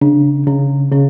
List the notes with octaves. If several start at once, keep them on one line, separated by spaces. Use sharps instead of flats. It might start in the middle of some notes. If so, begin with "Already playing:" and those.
C#3 D4
C#3 C#4
C#3 C#4